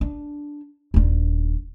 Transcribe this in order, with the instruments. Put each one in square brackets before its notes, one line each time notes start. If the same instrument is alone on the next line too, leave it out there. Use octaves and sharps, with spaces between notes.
[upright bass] D4
D#1 D4